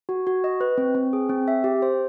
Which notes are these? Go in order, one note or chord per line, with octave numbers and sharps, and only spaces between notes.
F#4
F#4
D#5
B4
C4
C4
G#4
C4
E5
G4
C5